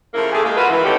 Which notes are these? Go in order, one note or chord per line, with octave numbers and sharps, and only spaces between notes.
C#3 F3 A3 A#3 E4 A#4
A3 G4 G#4
G#3 A#3
F4 F#4 A#4 B4
E3
A3 B3 C#4 D#4 G4